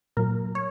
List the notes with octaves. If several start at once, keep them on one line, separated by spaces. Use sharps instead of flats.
A#2 F#3 A#3 A#4
C#5